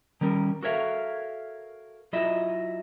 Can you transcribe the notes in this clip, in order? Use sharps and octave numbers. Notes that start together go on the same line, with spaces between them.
D#3 G3 C#4 A#4
F#4 A4 A#4 C#5 E5 F5
F#3 E4 F4 D#5 E5